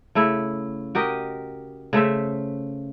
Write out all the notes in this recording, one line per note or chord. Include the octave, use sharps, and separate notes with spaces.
C#3 A3 E4
F#4 G4 A#4 D#5
C#3 A3 C5 E5